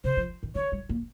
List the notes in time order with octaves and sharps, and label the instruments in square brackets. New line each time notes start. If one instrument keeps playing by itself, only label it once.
[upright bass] C3 [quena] C5
[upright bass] F3
D#3
[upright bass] D#3 [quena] C#5
[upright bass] G3
A#3